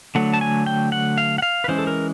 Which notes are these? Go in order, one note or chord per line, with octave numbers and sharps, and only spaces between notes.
D3 F#3 A3 F#5
A5
G#5
G5
F#5
F5
F#5
F5
B4
E3 G#3 C#4 C5
A4
A#4